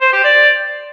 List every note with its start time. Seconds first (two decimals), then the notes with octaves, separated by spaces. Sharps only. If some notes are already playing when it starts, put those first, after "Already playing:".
0.01 C5
0.13 G4
0.24 D5